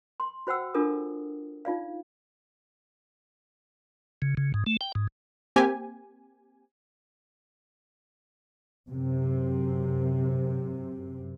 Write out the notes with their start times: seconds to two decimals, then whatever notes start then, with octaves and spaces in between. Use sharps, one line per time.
0.20 C6
0.47 F#4 C5 F#5 G5 E6
0.74 D4 F4 A4 A#4 D#6
1.65 D#4 F4 D5 F5
4.22 C#3
4.37 C#3
4.54 G#2
4.66 A3
4.81 G5
4.95 G#2
5.56 A#3 C4 G4 G#5
8.89 F#2 C3